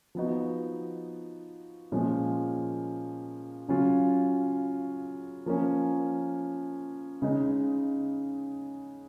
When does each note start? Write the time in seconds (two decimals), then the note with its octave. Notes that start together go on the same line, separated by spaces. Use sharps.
0.15 F3 B3 D#4 F#4
1.92 A#2 F3 G#3 C#4
3.69 C#3 F#3 C#4 F4
5.46 F3 A#3 C#4
7.22 C#3 G#3 D#4